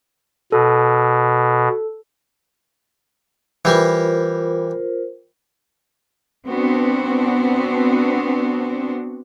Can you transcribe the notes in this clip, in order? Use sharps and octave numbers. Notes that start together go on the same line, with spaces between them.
B2 A4
E3 G3 F4 A#4 C5
B3 C4 D4 F#4